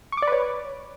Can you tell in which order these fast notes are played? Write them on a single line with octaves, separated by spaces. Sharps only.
C#6 D6 D5 B4 C#5